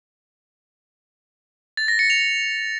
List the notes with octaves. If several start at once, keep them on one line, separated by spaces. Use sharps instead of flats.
A6
A#6
C#7
F7